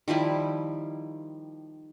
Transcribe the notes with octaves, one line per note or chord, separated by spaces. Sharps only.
D#3 F3 G3 E4